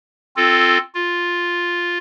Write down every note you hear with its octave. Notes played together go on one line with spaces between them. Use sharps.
C4 F4 A4
F4